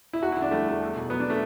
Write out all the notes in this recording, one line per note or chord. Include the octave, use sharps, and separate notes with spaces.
E4
E2 F#4
E4
D3
D4
G3 A3
E2 A3
E2
B2
F#3 B3
D4
A3